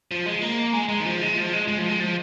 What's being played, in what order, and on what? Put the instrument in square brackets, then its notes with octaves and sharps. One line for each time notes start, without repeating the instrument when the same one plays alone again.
[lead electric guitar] F3
G#3
A#3
G#3
G#3
D#3
F3
G#3
F3
G#3
G#3
F3
G#3
F3